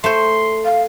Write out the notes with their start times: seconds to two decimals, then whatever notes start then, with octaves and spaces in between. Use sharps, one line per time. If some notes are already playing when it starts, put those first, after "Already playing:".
0.04 A3 C5 C6
0.65 F5